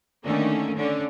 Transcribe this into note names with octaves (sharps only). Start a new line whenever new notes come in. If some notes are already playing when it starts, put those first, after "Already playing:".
D3 D#3 A3 A#3 C#4
D3 C#4 D4